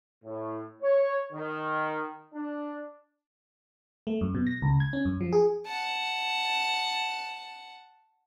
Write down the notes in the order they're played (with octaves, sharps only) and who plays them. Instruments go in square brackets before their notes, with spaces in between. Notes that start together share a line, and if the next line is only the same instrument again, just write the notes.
[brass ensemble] A2
C#5
D#3
D4
[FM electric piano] A3
F#2
B2
A#6
C#2
G#6
C#4
F#2
F3
G#4
[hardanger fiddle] F#5 A5